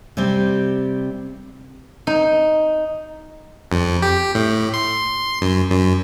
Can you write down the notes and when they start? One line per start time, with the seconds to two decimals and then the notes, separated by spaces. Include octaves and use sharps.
0.17 C3 G3 C4
2.07 D#4
3.72 F2
4.02 G4
4.35 A2
4.74 C6
5.41 F#2
5.71 F#2